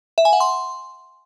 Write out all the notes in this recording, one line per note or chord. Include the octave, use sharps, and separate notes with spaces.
E5
G#5
F#5
C6